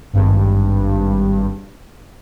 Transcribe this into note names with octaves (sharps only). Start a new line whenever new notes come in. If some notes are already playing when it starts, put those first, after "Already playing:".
G#1 G2